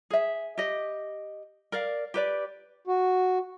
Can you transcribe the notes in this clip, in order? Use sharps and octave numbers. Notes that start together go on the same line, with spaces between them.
G#4 E5
G4 D#5
A#4 D5 F5
G4 B4 D5
F#4